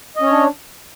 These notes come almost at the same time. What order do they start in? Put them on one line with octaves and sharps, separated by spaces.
D#5 C#4 C#5 D4